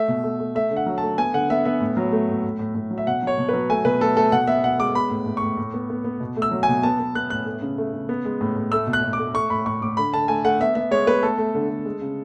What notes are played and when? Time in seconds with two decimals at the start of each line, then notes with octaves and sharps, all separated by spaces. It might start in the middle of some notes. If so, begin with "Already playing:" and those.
Already playing: A3 E5
0.08 B2
0.24 A3
0.40 A3
0.55 A3 E5
0.71 D3
0.76 F#5
0.86 F#3
0.98 A3 A5
1.18 B3 G#5
1.34 D3 F#5
1.50 B3 E5
1.65 B3 E5
1.81 A2
1.97 F#3
2.12 A3
2.29 A2
2.44 A2
2.59 A2
2.75 A2
2.91 F#3
2.98 E5
3.07 B2 F#5
3.22 F#3 C#5
3.38 B2
3.49 F#3 B4
3.70 A3 G#5
3.85 B2 B4
4.00 A3 A4
4.17 A3 A4
4.32 B2 F#5
4.47 B3 E5
4.64 B2 F#5
4.80 G#3 D6
4.95 B3 B5
5.10 A2
5.26 A2
5.37 A2 C#6
5.57 A2
5.74 B3
5.90 B3
6.04 B3
6.20 B2
6.36 A3
6.42 E6
6.51 F#3
6.63 G#5
6.68 B2
6.83 B3 A5
7.00 B3
7.15 B3 F#6
7.30 A2 F#6
7.46 A3
7.62 C#3
7.78 A3
7.94 C#3
8.09 B3
8.25 G#3
8.41 A2
8.56 A2
8.72 A3 E6
8.87 B2
8.93 F#6
9.04 B2
9.13 D6
9.19 A3
9.34 A3 C#6
9.50 A2 B5
9.65 A2 C#6
9.82 A2 D6
9.97 D3 B5
10.14 D3 A5
10.28 A3 G#5
10.44 A3 F#5
10.60 B3 E5
10.75 B3 E5
10.91 G#3 C#5
11.07 B3 B4
11.23 A3 A4
11.38 A3
11.55 D3
11.69 D3
11.85 G#3
12.01 C#3